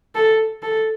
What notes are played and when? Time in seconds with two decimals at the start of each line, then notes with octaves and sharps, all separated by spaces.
0.15 A4
0.62 A4